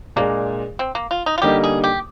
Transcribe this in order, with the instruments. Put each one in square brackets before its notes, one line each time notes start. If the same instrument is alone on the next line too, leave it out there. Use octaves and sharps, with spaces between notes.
[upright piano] A#2 G#3 D4 [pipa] A#3
[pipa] C4
A#3
F4
D#4
F4
[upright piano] D3 G3 A#3 D#4 [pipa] G4
[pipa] G#4
G4